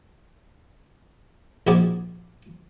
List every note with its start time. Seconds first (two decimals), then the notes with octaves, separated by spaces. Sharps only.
1.67 A#1 C4 D#4 F#4 G#4 D5